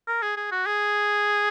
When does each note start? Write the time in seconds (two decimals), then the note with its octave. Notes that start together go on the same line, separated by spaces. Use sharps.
0.08 A#4
0.22 G#4
0.37 G#4
0.52 F#4
0.66 G#4